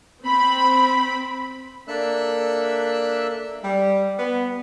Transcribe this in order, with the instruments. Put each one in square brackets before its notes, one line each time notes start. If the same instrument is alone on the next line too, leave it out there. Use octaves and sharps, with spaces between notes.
[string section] C4 B5
[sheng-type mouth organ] A#3 D4 A4 E5 E6 F#6
[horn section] G3
B3